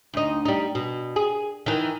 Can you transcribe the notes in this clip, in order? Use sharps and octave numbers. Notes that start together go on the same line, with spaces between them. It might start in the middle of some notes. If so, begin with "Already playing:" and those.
D2 D#4
G3 D#4
B2
G#4
D#3 E3